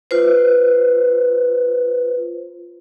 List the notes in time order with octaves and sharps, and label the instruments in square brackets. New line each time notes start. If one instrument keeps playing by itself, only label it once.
[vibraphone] F4 B4 C5